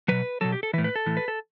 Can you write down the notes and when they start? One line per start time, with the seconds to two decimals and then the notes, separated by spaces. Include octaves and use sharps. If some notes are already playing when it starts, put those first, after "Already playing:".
0.08 B2 F#3 B4
0.41 B2 F#3 A4
0.52 G4
0.63 A4
0.73 E3 B4
0.78 A2
0.84 B4
0.96 A4
1.06 A2 E3
1.17 B4
1.28 A4